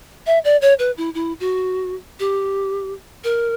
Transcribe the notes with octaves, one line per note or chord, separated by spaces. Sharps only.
E5
D5
C#5
B4
E4
E4
F#4
G4
A#4